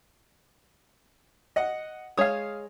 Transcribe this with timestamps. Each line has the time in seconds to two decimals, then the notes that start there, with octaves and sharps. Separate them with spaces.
1.56 D#5 F#5
2.18 G#3 C#5 F5 D#6